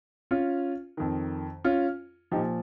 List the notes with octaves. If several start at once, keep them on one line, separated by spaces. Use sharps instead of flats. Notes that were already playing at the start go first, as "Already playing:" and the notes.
C#4 F4
F2 D#3
C#4 F4
A#2 F3 D#4 G4